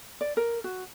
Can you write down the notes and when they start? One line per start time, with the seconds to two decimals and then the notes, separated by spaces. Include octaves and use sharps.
0.21 D5
0.37 A#4
0.64 F#4